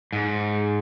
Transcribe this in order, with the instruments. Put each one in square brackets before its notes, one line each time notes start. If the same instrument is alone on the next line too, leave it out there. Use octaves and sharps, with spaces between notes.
[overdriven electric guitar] G#2